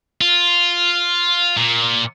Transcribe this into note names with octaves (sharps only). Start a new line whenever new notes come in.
F4
A#2